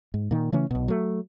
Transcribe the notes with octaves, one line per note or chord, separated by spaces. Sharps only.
G#2
A#2 D#3
C#3 E3 A3 C#4
B1 B2
F#3 A3